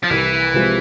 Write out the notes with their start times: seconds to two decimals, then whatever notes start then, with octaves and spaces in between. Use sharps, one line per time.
0.04 F3
0.10 C2 E3
0.54 C3 F3 G#3 C4